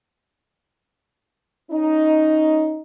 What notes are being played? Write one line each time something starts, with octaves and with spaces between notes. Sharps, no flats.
C#4 D#4